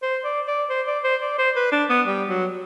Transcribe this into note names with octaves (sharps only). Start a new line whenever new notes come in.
C5
D5
D5
C5
D5
C5
D5
C5
B4
D4
B3
G3
F#3